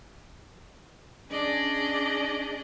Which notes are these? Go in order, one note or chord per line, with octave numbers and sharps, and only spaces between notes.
C#4 D4 G#4 D5 D#5